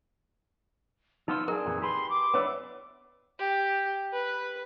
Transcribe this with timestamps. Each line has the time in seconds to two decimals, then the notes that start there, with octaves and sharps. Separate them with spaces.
1.28 F3 B3 D#4 F4 E6
1.48 D4 D#4 G#4 A#4
1.66 F2 A#2 E3
1.82 G4 G#4 B4 C6
2.10 D6
2.34 B3 D4 E4 B4 C#5
3.39 G4
4.13 B4